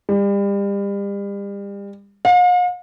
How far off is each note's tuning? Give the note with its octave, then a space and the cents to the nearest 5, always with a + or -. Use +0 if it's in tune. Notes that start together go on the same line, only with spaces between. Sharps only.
G3 +35
F5 +45